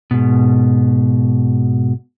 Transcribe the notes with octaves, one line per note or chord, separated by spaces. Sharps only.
G#2 B2